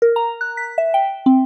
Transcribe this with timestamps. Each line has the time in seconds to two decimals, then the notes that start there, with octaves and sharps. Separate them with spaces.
0.02 A#4
0.16 A#5
0.41 F#6
0.57 B6
0.78 E5
0.94 G5
1.26 C4